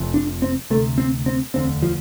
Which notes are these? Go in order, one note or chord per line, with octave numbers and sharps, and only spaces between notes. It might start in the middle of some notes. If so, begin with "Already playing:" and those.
Already playing: F1 F2 C3
D4
C4
D2 C3 A3
C4
C4
E1 D2 D3 C4
F3